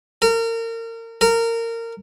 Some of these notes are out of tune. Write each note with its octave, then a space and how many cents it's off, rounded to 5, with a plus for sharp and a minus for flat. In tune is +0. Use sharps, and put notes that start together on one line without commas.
A#4 -30
A#4 -20